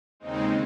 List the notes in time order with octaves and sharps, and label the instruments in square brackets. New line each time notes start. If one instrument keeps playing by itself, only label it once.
[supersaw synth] D#2 C#3 G#3 C4 D#4